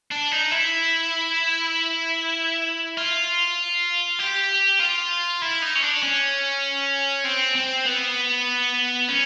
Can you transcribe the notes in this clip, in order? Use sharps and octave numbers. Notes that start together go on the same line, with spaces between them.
D4
D#4
E4
F4
G4
F4
E4
D#4
C#4
D4
C#4
C4
C4
B3
C#4